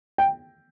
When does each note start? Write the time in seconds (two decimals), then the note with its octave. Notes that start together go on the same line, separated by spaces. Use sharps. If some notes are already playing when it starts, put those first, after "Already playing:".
0.18 G5